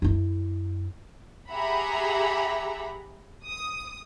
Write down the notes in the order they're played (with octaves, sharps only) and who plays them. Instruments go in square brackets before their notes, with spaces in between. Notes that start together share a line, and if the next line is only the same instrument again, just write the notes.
[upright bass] F#2 E4
[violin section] G4 G#4 E5 F#5 A#5 B5
D#6